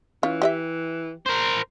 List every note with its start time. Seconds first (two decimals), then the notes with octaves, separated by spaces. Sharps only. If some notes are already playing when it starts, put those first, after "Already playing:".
0.23 E3 C#4 F4
0.42 G4 D#5 E5
1.26 A#4 C5